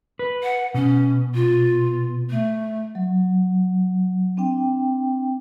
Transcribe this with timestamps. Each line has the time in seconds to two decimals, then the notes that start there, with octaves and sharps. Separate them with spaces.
0.19 B4
0.42 F#5
0.74 B2 C#4
1.34 F4
2.30 A3
2.95 F#3
4.37 C4 D4 G5